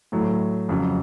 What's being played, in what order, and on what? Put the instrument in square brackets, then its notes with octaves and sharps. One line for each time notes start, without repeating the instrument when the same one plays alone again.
[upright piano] A2 F#3 A3
F2 C#3 F#3